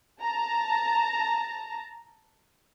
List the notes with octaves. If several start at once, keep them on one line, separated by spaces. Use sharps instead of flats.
A5 A#5